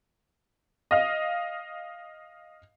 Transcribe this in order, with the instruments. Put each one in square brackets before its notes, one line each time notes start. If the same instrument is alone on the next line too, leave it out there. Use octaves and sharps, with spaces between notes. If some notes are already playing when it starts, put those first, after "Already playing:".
[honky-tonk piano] D#5 F5